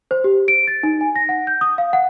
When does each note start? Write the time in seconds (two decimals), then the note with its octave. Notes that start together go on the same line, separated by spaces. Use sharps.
0.11 C5
0.24 G4
0.48 D7
0.68 A6
0.83 D#4
1.01 G#5
1.16 A#6
1.29 F#5
1.47 G6
1.61 D#6
1.78 F5
1.93 F#5